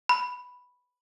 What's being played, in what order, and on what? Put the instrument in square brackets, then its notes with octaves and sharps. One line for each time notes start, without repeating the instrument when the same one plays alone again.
[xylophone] B5